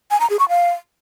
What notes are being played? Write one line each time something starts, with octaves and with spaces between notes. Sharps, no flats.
G#5
A#5
G#4
C#6
F5